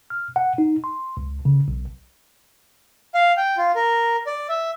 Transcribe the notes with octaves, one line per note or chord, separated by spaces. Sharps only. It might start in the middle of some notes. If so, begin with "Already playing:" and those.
F6
F#5
D#4
C6
C#2
C#3
B1
F5
G5
F4
A#4
D5
E5